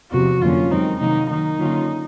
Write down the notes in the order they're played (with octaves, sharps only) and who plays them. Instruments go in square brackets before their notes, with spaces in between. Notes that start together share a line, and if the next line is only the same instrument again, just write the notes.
[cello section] E2 C3 F3 [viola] F#4
[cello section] F2 D3 F#3 A#3 C#4 [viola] F4
[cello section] F#2 D#3 G#3 C4 [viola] D#4
[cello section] C3 D#3 F#3 A#3 [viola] D#4
[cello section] D#3 F#3 A#3 [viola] D#4
[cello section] D3 F#3 A#3 C#4 F4